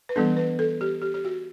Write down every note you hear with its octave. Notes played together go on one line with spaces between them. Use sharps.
B4
E3 G3 B3 D4 A4
B4
A4
G4
G4
G4
F#4